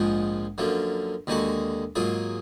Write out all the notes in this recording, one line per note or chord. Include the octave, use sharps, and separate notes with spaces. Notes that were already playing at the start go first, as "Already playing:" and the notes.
Already playing: A#1 G#2 F3 G#3
F#2 D3 F3 A#3
D#2 D3 G#3 D#4 F#4
G#2 F#3 A#3 F4 G#4